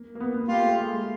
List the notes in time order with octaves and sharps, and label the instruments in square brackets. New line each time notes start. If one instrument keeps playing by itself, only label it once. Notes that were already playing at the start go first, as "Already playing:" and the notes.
Already playing: [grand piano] A#3
A#3
B3
B3
[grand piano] A#3 [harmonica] F4 G4
[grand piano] A3
G#3